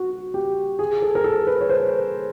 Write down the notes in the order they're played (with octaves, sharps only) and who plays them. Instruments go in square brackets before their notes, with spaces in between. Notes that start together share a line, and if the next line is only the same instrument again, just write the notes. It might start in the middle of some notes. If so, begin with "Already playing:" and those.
Already playing: [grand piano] F#4
G4
G#4
A4
A#4
A4
B4
C#5
C5